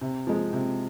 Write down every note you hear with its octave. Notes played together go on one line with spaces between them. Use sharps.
C3
F3 G#3
C3